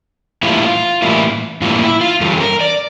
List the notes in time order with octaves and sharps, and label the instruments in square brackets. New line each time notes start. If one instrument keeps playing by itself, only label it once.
[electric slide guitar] A2 E3 G3 A#3 E4 F4
A2 E3 G3 A#3 E4
A2 E3 G3 A#3 E4 F4
E4
F4
G2 E3 G3 C#4 A4
A#4
D5